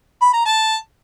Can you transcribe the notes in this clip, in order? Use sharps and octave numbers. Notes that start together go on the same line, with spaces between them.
B5
A#5
A5